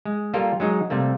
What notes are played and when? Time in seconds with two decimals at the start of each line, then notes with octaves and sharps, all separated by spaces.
0.05 G#3
0.34 G3 A#3 F4 A4 A#4
0.60 F#3 G#3 D#4 G#4
0.90 C3 G3 A3 A#3